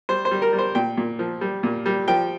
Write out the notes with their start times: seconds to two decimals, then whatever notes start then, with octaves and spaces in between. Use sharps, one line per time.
0.09 G3 C5
0.25 C5
0.31 G3
0.42 A#4
0.53 G3
0.58 C5
0.75 A#2 G5
0.97 A#2
1.19 F3
1.41 G3
1.63 A#2
1.86 G3
2.08 F3 G5